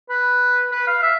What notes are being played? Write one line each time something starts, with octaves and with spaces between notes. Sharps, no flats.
B4
B4
F5
E5